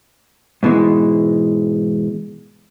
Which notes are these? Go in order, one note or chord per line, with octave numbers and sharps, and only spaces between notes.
G#2 B2 E3 G#3